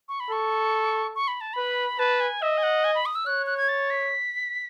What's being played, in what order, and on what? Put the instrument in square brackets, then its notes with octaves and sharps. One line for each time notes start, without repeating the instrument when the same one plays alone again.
[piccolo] C#6
B5
[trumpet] A4 [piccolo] C#6
[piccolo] C#6
B5
A5
[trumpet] B4 [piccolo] B5
[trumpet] B4 [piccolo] A5
[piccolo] G#5
[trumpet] D#5 [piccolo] E5
[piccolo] G#5
F#5
G#5
B5
D#6
E6
[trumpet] C#5 [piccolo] F#6
[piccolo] F#6
G#6
A6
B6